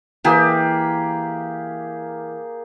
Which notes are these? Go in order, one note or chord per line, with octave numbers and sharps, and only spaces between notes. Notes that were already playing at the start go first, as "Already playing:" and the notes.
E3 A#3 G4 G#4